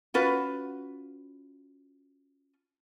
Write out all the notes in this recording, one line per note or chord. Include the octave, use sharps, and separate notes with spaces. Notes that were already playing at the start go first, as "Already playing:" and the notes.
C#4 F4 F#4 B4